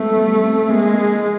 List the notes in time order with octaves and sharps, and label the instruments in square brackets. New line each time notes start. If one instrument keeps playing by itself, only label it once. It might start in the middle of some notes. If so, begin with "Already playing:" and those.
Already playing: [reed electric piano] G#3 B3 [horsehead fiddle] A3
[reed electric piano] G3
C4
[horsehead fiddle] G#3 [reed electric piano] A#3